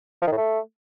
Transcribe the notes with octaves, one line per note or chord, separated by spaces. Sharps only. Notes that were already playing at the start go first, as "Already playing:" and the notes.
F3
D#3
A2
A3